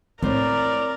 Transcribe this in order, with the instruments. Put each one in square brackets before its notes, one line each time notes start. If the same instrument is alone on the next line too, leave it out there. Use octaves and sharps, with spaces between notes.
[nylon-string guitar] A2 C5 [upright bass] C4 [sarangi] A#4 [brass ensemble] D5